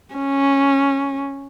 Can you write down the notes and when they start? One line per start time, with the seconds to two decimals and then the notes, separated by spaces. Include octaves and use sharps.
0.15 C#4